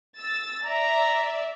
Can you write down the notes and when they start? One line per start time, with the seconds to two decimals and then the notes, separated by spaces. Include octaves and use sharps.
0.18 E6 A6
0.65 D5 E5 A#5